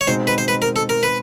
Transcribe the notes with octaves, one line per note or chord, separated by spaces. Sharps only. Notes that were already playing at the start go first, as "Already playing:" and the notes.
C#5
B2 G#3 C4 D#4 C5
B4
C5
B4
A#4
A4
A#4
B4